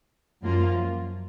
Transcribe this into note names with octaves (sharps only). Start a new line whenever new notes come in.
F#2 F3 A#3 F4